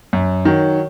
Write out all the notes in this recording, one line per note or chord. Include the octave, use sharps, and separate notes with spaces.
F#2
D#3 F#3